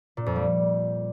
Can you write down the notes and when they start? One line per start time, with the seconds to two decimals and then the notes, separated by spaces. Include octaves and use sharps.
0.17 A#2
0.26 F2
0.36 G3